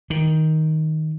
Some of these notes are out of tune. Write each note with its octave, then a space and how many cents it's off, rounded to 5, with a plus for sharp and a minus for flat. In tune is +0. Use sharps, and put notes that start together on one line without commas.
D#3 +10